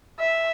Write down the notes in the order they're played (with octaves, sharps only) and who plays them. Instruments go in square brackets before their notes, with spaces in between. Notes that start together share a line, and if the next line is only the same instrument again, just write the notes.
[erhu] E5